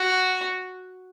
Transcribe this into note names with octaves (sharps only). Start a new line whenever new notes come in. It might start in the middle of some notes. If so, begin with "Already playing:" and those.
Already playing: F#4